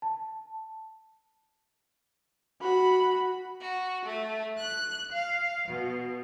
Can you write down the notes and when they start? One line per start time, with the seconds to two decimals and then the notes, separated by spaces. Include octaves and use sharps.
0.02 A5
2.61 F#4 B5
3.60 F#4
4.06 A3
4.58 F#6
5.13 F5
5.69 B2